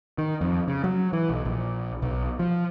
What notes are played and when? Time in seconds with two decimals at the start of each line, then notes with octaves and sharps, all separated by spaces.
0.18 D#3
0.41 F2
0.68 C#3
0.84 F#3
1.13 E3
1.29 B1
1.45 A#1
2.02 B1
2.39 F3